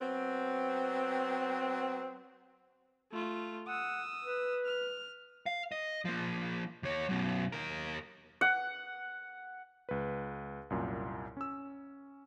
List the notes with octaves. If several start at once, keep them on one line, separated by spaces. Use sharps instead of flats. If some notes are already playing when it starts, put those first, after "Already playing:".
F#3 B3 C4
A3 F4
F#5 D#6 E6
B4
F6
F5
D#5
F3 A#3
D#2 C#5
F#2 B2
D#2 A#4
F#5
C#2 B4
C2 F#2 A#2
C#4 E6